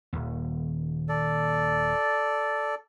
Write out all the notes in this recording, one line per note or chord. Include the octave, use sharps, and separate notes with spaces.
D#1 D#2
A4 D5